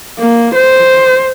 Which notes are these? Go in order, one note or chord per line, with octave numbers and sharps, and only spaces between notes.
A#3
C5